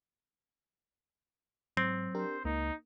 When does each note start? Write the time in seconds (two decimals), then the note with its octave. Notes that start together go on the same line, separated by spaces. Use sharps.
1.77 G#2 F#3 C4
2.15 D4 G4 A#4 C5
2.45 C#2 A#3 D#4